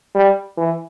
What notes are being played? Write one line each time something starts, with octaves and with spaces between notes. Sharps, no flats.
G3
E3